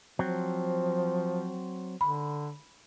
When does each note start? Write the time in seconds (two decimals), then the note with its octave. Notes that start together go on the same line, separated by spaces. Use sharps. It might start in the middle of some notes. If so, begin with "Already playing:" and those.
0.19 F3 F#3 C4
2.01 D3 B5